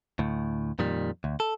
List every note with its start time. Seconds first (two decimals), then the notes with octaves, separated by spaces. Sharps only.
0.19 D2 A2
0.79 F2 A#2 D#3 G3
1.24 D2
1.40 A4